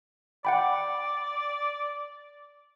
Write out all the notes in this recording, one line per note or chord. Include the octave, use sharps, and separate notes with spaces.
D5 F#5 G5 B5